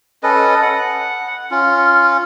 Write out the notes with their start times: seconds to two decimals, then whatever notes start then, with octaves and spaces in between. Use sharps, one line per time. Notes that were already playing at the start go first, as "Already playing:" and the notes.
0.23 C#4 A4 B4 D#5
0.62 F#5
1.51 C#4 F4